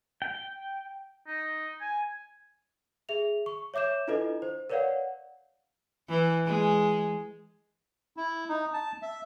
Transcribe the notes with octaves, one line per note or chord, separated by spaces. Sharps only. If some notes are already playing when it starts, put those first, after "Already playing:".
G5
D#4
G#5
G#4 E5 F7
C#6
C#5 E5 D6 G6 E7
D4 E4 F4 A4 B4 D#5
C5
A#4 B4 C#5 D5 F5 F#5
E3
G#3
E4
D#4
A5
E5